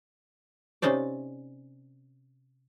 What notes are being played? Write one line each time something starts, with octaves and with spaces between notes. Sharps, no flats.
C3 C#4 D#4 C5 D5